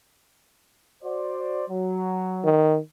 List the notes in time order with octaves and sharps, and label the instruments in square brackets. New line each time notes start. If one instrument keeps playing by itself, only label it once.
[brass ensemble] F#4 C5 D5
F#3
[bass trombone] D#3